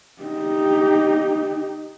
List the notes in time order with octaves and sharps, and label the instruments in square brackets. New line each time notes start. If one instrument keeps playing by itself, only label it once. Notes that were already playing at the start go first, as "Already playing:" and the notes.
[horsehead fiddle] D#4 G4